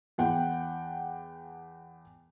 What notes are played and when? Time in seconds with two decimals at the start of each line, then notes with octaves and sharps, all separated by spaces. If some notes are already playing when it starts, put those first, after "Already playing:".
0.18 E2 F#5 G5